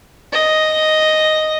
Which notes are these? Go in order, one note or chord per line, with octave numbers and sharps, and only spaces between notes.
D#5